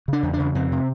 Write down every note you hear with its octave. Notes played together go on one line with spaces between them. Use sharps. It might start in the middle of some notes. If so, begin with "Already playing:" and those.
C#3 D4
E2
D4
C#3
F2 C4
C3